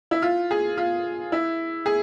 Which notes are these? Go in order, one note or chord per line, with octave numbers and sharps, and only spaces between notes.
E4
F4
G#4
F4
E4
G#4